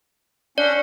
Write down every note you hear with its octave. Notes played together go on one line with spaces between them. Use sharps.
C#4 D4 D5 F#5